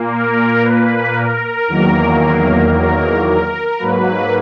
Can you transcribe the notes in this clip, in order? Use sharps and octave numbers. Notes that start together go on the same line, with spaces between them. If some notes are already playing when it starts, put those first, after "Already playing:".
Already playing: A#2 A#3
A#4
B4
A#4
E2 D#3 F#3 A#3
A#4
A#4
G#2 F#3 A#3 B4